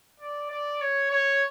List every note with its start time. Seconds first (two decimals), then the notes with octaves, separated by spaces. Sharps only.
0.20 D5
0.50 D5
0.81 C#5
1.11 C#5